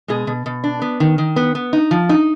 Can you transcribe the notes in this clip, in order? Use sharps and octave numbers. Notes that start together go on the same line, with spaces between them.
B2 G#3 G#4
B2
B2
D4
B3
D#3
D#3
B3
B3
D#4
F3
D#4